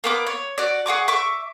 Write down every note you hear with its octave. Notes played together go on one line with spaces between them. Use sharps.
A#3 B3 D6
C#5
F#4 D5
G#4 F#5 C#6 D6
E5 C#6 D6